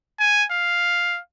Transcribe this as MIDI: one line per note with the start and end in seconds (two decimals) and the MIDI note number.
0.19 0.44 80
0.51 1.19 77